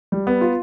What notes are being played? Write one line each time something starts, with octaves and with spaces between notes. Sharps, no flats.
G3
B3
F4